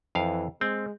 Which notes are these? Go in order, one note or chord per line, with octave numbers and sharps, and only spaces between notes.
F2 E3 F5
G#3 C4